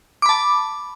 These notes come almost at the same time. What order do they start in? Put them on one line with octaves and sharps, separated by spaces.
D6 B5 A5